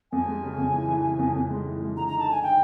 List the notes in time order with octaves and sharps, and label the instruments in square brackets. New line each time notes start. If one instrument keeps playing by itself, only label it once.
[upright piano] F2 [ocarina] G#5
[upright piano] G#3
C#3
F2
E3
E3
C#3
F2
F2
G#3
E3
G#3
[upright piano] D3 [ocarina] A#5
[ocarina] A#5
[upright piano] D#4
[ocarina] A5
[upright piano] D3 [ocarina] G#5
[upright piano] D#4 [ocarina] G5